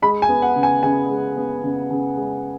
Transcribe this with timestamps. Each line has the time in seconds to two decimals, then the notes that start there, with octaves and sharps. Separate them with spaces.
0.02 G#3 B5
0.22 G#5
0.29 B3
0.42 F#5
0.56 C#3
0.63 G#5
0.83 C#3 G#5
1.10 G#3
1.37 B3
1.63 C#3
1.90 C#3
2.17 G#3